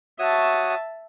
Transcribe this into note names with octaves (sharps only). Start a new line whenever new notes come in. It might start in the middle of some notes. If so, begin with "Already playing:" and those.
F#4 C#5 E5 A5 D#6